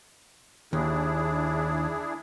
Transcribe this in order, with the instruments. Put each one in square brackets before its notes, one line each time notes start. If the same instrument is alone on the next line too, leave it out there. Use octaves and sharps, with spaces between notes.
[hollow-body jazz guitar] D#2 [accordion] D4 E4 G#4